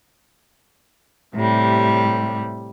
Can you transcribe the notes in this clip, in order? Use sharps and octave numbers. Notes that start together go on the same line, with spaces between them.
A2 C3 G3